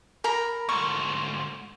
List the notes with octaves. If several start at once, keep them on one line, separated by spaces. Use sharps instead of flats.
A#4 A#5 B5
D2 G#2 C#6